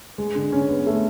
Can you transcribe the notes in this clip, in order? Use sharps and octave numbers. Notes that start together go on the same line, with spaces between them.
G#3
D3
C#4
B3
A3